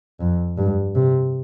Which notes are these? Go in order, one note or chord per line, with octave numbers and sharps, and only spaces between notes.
F2
G2
C3